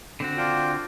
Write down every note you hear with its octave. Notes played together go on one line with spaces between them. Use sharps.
D3 C4 F#4
D4 F4 G5